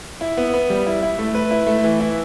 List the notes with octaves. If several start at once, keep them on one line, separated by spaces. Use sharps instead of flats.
E4
B3
B3
G3
E4
E4
A3
B4
E4
A3
E3
E4